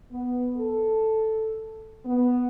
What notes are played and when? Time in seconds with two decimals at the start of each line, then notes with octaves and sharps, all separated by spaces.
0.11 B3
0.56 A4
2.05 B3